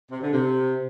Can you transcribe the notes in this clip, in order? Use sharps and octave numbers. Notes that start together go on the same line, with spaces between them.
C3
D3
C3